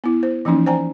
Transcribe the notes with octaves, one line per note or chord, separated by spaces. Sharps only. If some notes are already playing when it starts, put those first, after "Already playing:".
B3 E4
C5
E3 F3 A#3 C#4 D#4
C5 D5 G5 G#5 A#5